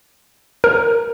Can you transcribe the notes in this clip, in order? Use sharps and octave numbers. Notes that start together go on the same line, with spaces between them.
A#4